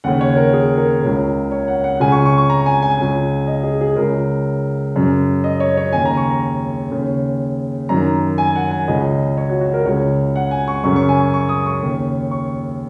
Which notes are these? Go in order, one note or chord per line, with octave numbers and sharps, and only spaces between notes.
D#2 C#3 F#5
C#5
A#4
G#4
A#4
C#2 C#3
C#5
F#5
F#5
C#2 C#3 G#5
C#6
C#6
C#6
A#5
G#5
G#5
C#2 C#3
D#5
G#4
G#4
C#2 C#3 A#4
F#2 C#3
D#5
C#5
C#5
D#2 C#3 G#5
A#5
C#6
A#5
D#2 C#3
F#2 D#3 A#5
G#5
F#5
G#5
C#2 C#3 D#5
C#5
F#4
F#4
A#4
C#2 C#3 C#5
F#5
G#5
C#6
F#2 C#3 C#6
C#6
G#5
C#6
C#6
D#6
C#6
D#2 C#3
C#6